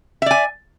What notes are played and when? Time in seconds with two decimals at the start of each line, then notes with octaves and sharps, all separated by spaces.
0.22 E5
0.26 D5
0.31 G#5